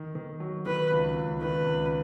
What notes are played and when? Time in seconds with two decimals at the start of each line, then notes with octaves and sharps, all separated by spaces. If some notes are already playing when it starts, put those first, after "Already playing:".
Already playing: D#3
0.15 D#3
0.40 F#3
0.66 D#3 B4
0.91 C#2
1.16 C#2
1.41 D#3 B4
1.66 C#2